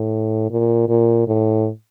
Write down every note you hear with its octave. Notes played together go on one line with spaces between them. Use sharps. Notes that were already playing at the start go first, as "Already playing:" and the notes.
Already playing: A2
A#2
A#2
A2